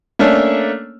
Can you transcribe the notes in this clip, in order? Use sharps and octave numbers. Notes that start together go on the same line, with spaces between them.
A3 A#3 C#4 D4